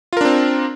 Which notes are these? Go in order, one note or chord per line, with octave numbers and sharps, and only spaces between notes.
C4 D4 F4 A#4